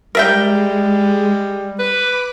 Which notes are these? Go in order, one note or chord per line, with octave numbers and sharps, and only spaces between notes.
G3 G#3 A#4 E5 G5
B4 B5 D6